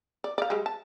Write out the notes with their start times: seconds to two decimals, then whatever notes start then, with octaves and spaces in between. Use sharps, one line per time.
0.24 D5
0.38 D5 F5
0.50 G3 G#3
0.66 A5